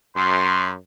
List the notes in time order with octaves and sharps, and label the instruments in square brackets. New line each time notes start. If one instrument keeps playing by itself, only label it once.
[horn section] F#2 [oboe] C6